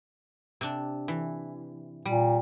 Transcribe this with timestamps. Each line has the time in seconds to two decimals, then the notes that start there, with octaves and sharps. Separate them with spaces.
0.61 C3 D4
1.08 E3
2.05 A#2 G3